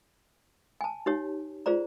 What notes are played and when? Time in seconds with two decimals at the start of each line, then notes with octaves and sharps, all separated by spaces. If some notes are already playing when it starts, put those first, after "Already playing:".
0.81 G#5 A5
1.06 D#4 G4 C#5
1.66 F4 G#4 C5 D5 A#5